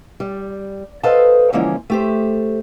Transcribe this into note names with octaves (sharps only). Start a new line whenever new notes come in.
G3
A4 B4 C5 D#5 F5 A5
D3 E3 F3 G#3 A#3 C#4
A3 G4 C5